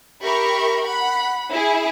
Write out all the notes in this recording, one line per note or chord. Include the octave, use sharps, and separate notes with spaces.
G4 A#4 E5 B5 C#6
F#5 B5
E4 G#4